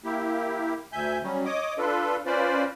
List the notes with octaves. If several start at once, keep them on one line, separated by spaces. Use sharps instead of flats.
A#3 E4 G4
D2 E5 G#5 G6
F#3 G3 C#4
C#5 D#5 D6 D#6
D4 F4 A4 B4
C#4 F4 B4 C5 D5